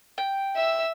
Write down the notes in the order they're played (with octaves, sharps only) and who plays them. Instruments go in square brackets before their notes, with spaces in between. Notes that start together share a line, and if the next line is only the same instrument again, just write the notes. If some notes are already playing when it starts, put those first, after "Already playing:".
[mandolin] G5
[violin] E5 E6